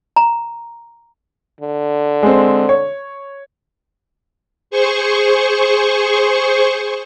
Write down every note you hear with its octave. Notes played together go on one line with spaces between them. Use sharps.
A#5
D3
G#3 C4
C#5
G#4 C5 C#6